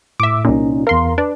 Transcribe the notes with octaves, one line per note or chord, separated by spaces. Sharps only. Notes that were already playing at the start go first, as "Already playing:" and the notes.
A2 E5 D6
C2 A#2 C#4 D#4
E2 A#4 F5 C6
D4 B4